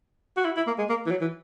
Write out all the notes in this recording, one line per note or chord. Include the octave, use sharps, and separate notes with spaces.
F#4
E4
E4
A#3
G#3
A#3
E3
F#3
E3